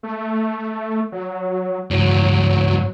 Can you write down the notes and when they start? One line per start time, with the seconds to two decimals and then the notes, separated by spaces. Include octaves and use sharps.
0.03 A3
1.12 F#3
1.91 C#2 G2 F#3